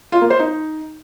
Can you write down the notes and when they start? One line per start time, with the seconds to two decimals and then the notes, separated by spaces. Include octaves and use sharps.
0.12 F4
0.21 A#3
0.30 C5
0.39 D#4